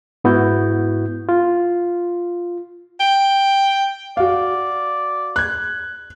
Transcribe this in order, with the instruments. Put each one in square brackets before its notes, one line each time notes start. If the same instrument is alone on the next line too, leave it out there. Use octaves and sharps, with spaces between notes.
[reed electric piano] G#2 B3 E4 F#4 G6
F4
[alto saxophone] G5
[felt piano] F#4 F5 [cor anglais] D5
[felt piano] F#6 G#6